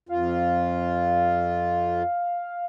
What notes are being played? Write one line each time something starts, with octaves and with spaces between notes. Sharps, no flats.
F2 F4 F5